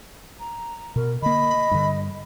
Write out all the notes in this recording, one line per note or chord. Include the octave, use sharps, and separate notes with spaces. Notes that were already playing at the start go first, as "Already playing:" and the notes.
A#5
B2 A#4
D3 A#3 D#5 B5
G2 D3